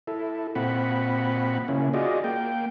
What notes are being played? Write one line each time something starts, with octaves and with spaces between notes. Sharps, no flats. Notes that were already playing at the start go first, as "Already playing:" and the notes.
E4 A4
A#2 C4 F#5 B5
C#3 A#3 C#4 E4
F4 F#4 G#4 D5 D#5
A#3 G5